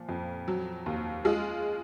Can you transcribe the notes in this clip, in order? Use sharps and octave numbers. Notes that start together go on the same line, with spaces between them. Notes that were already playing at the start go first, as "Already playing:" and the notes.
Already playing: A#2 F3
F2
F#3
D#2
G#3 F4